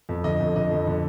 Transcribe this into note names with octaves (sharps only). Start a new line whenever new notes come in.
F2
D3 D#5
F2
D3 D#5
F2
D3